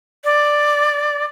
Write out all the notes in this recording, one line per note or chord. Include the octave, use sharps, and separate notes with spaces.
D5